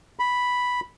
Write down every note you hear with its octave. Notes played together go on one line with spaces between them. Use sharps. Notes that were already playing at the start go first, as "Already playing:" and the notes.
B5